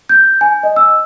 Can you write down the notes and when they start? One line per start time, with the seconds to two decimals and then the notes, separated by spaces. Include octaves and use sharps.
0.09 G6
0.41 G#5
0.63 D#5
0.76 E6